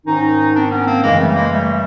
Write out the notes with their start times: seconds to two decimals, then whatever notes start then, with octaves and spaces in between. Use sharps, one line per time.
0.06 G#2 D#3 C#4 D#4
0.54 C4 D4
0.71 B3 C#4
0.86 A#3 C4
1.03 F#2 C#3 E3 G#3 A#3
1.19 G3 A3
1.35 G#3 A#3
1.51 G3 A3